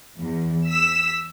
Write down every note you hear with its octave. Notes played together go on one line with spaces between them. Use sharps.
E2
E6 B6